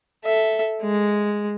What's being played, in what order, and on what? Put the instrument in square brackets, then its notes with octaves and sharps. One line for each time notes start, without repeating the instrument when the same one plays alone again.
[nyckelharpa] A4 E5
G#3